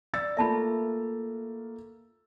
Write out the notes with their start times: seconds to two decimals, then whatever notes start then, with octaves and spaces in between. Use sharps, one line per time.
0.13 D5 E6 A6
0.37 A3 A#3 F4 E5 A5 B5